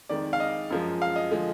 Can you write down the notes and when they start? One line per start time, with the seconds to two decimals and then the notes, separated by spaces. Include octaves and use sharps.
0.09 F2 D#3 G#3 D5
0.33 F5
0.40 D#5
0.70 F#2 F3 G#3
1.02 F5
1.16 D#5
1.31 D3 F3 G#3